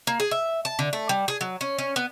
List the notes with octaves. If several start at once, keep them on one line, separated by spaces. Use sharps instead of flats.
A#3
G#4
E5
A5
D3
A3
G3
G#4
F#3
C#4
C#4
B3